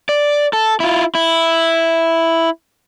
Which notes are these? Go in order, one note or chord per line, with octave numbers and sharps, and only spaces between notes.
D5
A4
E4 F4
E4